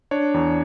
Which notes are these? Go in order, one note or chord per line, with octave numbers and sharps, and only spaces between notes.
D4 C#5
E2